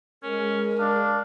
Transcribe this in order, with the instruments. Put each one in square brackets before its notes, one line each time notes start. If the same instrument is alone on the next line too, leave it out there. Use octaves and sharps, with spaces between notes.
[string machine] G#3 [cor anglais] C#4 [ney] A#4
[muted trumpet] D4 [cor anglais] F5